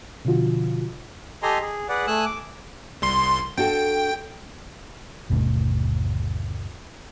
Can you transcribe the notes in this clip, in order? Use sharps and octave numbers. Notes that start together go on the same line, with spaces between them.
B2 D3 F3 F4 F#4
G4 A4 D#5 G#5 A#5 C6
G#4
G#4 B4 D5 F#5
A3 G#5 D#6 E6 F#6
D6
C2 C6
D4 F#4 A4 G5
G1 D#2 B2 A3